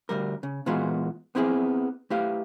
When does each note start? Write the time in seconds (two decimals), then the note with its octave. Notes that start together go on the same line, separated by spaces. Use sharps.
0.09 D2 G#2 G3 A#4
0.43 C#3
0.66 A#2 E3 G#3 B3 F4 F#4
1.35 B3 C4 E4 G4 G#4
2.10 A3 E4 G4 B4 F5